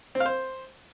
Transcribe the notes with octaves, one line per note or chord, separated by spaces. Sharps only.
C4
F5
C5